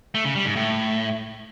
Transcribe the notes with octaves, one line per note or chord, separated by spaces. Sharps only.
A3
C#3
G3
G#2
A2